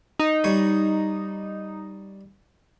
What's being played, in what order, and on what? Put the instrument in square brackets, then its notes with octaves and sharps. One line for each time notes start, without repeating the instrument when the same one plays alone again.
[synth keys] D#4
[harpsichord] G3 C#5 D#6